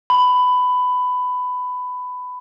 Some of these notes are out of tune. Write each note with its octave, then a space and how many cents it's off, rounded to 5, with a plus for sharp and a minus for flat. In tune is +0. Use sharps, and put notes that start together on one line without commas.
B5 +15